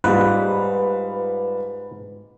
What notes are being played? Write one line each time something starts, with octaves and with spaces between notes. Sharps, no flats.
G#2 G3 F4 B4